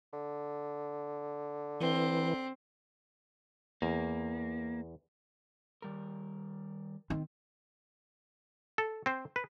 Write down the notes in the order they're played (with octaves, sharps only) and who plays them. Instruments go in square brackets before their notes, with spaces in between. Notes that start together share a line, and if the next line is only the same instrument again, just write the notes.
[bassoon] D3
[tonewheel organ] E3 [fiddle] C4
[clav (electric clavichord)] E2 [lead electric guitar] A#3
[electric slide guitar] D#3 G3 A#4
[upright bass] D#3 [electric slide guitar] C4
[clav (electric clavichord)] A4
C4 C5
B4